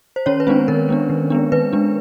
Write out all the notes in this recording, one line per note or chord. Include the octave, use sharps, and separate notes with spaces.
C5
D#3 C#4 C#5
B4
G#3 B3 C4 D4 C5
D#3 A#4
G#3 B3 D4
D#3
G#3 B3 D4
D#3 B4
G#3 B3 D4